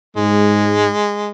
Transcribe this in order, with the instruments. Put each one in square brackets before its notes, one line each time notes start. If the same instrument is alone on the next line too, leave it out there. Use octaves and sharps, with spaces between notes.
[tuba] G#2 [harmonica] G#3